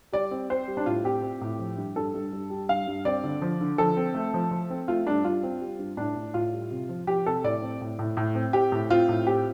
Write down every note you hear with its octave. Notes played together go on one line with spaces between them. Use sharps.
G3 D5
C4
C4 C5
G3
D4
A2 F4
C4 G4
C4
A2
F3
G2
G2 A4
G2
G2
G3
G2 F5
G2
C4 D5
D3
F3
D3
F3 A4
C4
A3
F3
F3
C4
A3 F4
G2 D4
G2 F4
C4
G3
G2
A2 D4
A2
A2 F4
G3
C3
F3
F3 G4
C3 A4
A2 D5
C4
A2
A2
A2
C4
C4 G4
A2
C4 F4
A2
C4 G4